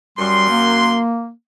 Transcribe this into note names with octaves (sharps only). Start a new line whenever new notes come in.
F#2 G3 C6
A#3